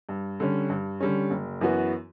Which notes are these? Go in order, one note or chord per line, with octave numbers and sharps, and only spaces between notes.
G2
D3 G3 C#4
G2
D3 G3 C#4
F#1
F#2 E3 B3 F#4